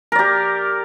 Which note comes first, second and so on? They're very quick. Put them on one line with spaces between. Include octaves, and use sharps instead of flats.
A#4 D5 G4